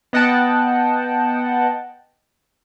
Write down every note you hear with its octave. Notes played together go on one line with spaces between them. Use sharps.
B3 D#5 F#5 G5 A5